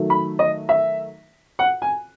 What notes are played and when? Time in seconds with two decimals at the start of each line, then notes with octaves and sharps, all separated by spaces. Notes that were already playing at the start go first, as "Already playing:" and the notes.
Already playing: D#3 F#3 A3
0.10 B5
0.39 D#5
0.69 E5
1.59 F#5
1.82 G#5